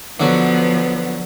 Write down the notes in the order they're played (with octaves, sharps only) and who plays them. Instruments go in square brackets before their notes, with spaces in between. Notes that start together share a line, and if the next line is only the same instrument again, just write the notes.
[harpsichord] D3 F#3 [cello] F3 B3